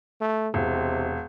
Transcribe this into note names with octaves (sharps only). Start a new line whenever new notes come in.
A3
E1 C3